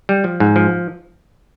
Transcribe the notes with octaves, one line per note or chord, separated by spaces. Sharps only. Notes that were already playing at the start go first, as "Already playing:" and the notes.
G3
F3
G#2
F3